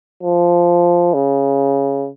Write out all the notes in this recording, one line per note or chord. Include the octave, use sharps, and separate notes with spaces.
F3
C#3